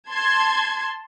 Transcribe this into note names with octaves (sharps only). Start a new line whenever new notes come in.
A5 C6 G#6